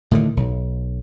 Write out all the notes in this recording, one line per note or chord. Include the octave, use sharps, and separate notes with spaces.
A2 D3 D#3
B1